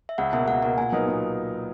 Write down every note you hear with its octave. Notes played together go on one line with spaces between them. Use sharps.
E5
C#2 F#5
B2 A#3 E5
C#2 F#5
B2 A#3 F#5
A#2 G#5
F#3 B3 D#4 A#4
A#2